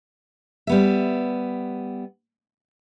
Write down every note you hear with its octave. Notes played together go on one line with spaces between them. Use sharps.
G3 B3 E5